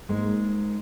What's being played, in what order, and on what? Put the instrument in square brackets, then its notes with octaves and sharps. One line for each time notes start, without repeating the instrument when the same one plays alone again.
[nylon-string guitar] G#2 G#3 A#3